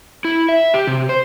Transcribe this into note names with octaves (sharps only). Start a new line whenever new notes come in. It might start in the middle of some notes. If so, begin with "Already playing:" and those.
E4
E5
G4
C3
C5